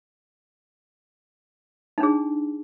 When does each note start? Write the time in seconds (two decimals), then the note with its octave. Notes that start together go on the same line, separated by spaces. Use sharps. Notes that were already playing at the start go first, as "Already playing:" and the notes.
1.98 D#4
2.00 D4
2.03 G#4